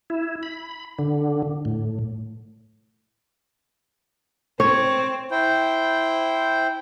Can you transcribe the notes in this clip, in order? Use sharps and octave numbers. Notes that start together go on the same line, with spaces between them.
E4
B5
D3
A2
C4 C#5
E4 C5 G5